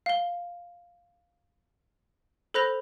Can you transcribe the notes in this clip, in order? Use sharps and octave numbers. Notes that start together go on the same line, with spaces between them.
F5 G7
A4 C5 B5 F#6 A#6 F7